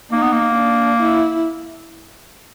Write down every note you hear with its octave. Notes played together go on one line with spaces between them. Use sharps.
A#3 D#4
B3
A#3
D4
E4